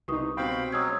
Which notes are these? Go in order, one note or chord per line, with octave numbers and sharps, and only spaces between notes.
C2 B3 D#4 G4 C#6 D#6
B2 C4 F5 G5 B5
F#3 G#3 C#4 D#6 E6 G#6